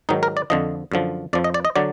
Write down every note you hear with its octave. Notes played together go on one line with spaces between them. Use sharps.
G#2 D#3 F#3 D#4
A#4
D5
F2 D3 F3 D#5
F#2 D3 F3
F2 F3 D5
D#5
D5
D#5
D3 F#3 D5